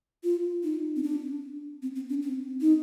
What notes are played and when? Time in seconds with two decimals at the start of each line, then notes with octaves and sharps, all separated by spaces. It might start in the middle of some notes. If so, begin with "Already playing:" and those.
0.24 F4
0.63 D#4
0.96 C4
1.03 D4
1.82 C4
1.95 C4
2.09 D4
2.22 C4
2.61 D#4